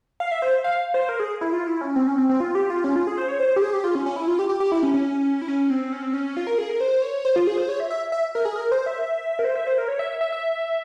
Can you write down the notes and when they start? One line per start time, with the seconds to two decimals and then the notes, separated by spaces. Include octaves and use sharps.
0.20 F5
0.32 E5
0.42 C5
0.64 F5
0.94 C5
1.09 A#4
1.20 G#4
1.41 E4
1.52 F4
1.67 E4
1.81 C#4
1.96 C4
2.07 C#4
2.18 C4
2.29 C4
2.40 F4
2.55 G4
2.70 F4
2.84 C#4
2.96 F4
3.07 G#4
3.18 C5
3.28 C#5
3.40 C5
3.56 G4
3.62 G#4
3.73 G4
3.84 F4
3.95 C#4
4.06 C#4
4.16 E4
4.28 F4
4.39 G4
4.49 G4
4.60 G4
4.72 E4
4.83 C#4
4.94 C#4
5.42 E4
5.48 C#4
5.70 C4
5.92 C#4
6.03 C4
6.13 C#4
6.37 F4
6.47 A#4
6.58 G#4
6.69 A#4
6.80 C5
7.02 C#5
7.25 C5
7.36 F4
7.47 G#4
7.58 C5
7.69 C#5
7.80 E5
7.90 E5
8.12 E5
8.35 A#4
8.45 G#4
8.56 A#4
8.71 C5
8.86 E5
9.39 A#4
9.44 C5
9.56 E5
9.67 C5
9.78 A#4
9.88 C#5
9.99 E5
10.11 E5
10.21 E5
10.32 E5